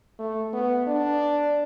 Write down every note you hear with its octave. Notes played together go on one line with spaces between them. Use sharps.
A3
B3
D4